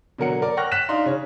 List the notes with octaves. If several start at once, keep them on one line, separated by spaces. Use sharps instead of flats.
B2 D3 F#3 A#4 F#5 C#7
A#4 D5
F#5 G5 C#6 F6 F#6 A#6
F#6 B6 E7
D4 D#4 F5 C6
C#3 C#5